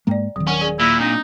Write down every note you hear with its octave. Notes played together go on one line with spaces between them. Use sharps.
G#2 G#3 A#3 D5 G5 A#5
D#1 D#3 F#3 C4
C#4 A#4 F#5
G#4 D5 G#5
A#2 E4
A#3 C4 D4 D#4